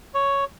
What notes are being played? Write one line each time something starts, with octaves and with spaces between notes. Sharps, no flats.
C#5